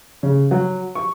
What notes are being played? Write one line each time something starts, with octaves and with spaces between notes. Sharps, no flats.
C#3
F#3
C#6